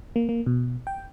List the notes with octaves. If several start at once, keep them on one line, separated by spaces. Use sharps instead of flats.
A#3
A#3
B2
G5